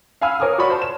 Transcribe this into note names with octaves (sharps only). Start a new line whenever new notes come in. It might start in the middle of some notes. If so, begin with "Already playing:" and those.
F5 F#5 G#5 B5 E6 F6
A#4 C#5 G#5 D6 D#6 F6
F#4 C#5 D5 B5 C#6
C5 A5
E7